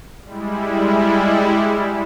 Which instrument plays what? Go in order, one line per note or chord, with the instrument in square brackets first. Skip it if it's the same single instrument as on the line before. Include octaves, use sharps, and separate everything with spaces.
[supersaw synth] G3 G#3 E4